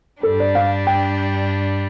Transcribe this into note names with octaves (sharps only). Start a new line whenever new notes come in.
G2 G3 D4 A4
D5
F5
G5